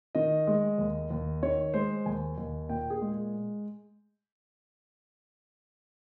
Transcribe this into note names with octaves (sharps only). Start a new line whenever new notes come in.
D#3 D#5
G#3
D#2
D#2
D#3 C#5
G#3 C5
D#2 G#5
D#2
A#2 G5
G#4
G#3